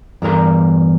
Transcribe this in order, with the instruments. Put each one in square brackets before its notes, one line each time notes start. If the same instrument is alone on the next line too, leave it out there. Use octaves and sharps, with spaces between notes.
[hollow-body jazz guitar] E2 G2 A#4 A#5